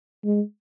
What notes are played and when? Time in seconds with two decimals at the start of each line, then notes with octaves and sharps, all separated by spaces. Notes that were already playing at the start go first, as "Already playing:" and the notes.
0.24 G#3